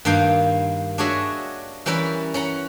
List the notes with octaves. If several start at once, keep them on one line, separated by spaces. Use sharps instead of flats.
G2 D#3 A#3 F5 G5
D4 F#4 G#4 C#5 D#5 E5
E3 G3 C#4 A#4 B4 E5
C#4 F#5 A#5